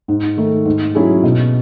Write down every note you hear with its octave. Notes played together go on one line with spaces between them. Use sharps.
G#2
D#3 A3
G#2
F#3 C#4 E4 G#4
B2